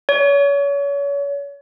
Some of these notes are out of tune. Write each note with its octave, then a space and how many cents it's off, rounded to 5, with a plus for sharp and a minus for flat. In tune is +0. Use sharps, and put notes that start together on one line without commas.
C#5 +35